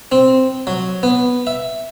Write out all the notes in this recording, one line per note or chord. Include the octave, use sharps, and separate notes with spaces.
C4
F#3
B3
E5